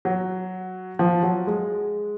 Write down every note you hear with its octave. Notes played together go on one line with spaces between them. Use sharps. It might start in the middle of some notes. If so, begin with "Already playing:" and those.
F#3
F3
F#3
G#3